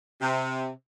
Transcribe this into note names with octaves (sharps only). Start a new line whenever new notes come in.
C3